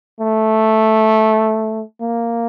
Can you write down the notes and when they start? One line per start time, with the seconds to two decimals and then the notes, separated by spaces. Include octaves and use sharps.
0.20 A3
2.02 A#3